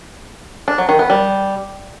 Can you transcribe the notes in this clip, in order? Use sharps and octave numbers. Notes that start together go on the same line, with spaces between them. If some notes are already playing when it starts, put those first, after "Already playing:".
D4
F#3
D#3
B3
G3